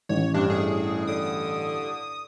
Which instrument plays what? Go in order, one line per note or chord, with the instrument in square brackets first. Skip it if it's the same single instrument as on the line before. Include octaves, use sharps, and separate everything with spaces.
[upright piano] A1 [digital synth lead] C#5
[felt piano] G2 [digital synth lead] D4
[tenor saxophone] A2 [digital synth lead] G#4
[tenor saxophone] D3 [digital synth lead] D#6